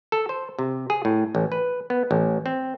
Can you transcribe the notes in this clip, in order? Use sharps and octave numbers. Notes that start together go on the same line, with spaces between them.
A4
C5
C3
G#4
A2
A1
B4
B3
A1
C4